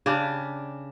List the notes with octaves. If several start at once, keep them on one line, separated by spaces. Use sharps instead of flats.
C#3 D4 G4